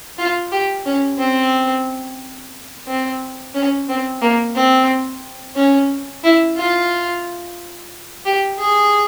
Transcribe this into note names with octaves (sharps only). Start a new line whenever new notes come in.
F4
G4
C#4
C4
C4
C#4
C4
A#3
C4
C#4
E4
F4
G4
G#4